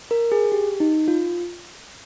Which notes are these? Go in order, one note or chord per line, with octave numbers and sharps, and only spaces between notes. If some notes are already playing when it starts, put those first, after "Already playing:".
A#4
G#4
G4
D#4
F4